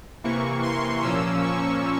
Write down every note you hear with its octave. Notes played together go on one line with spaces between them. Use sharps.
C3 E3 A#3 C#6
C6
A#2 F3 A#3 C#4 E6
C#6